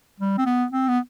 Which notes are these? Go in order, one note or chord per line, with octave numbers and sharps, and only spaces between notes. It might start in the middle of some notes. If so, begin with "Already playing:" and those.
G3
C4
B3
C4
B3